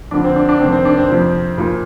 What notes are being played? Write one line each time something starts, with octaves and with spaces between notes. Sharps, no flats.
F2 D3 F3 D4
C4
D4
D4
F2 C3 D#3 C4
C4
D4
C4
F2 C3 F3
A#2 F3